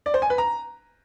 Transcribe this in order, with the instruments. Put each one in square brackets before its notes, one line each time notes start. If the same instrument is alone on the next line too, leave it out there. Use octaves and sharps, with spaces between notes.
[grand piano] D5
C5
G#5
B4
A#5